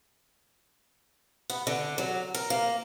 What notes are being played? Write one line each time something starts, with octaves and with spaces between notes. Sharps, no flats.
B3
D3
F#3
A#4
A#3